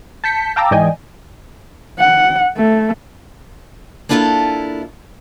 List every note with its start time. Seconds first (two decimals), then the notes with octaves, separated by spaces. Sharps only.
0.24 A5 G6 B6 C#7
0.56 F5 G5 A5 A#5 D6 E6
0.71 G#2 E3 D5 D#5 G5 G#5
1.99 F#5
2.57 A3
4.09 A#3 D4 E4 F4 G#4 A4